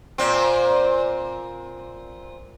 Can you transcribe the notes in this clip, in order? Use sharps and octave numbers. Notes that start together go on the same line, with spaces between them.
A#2 C4